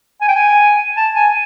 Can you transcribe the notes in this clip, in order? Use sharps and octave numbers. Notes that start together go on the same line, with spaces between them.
G#5
G5
G#5
A5
G#5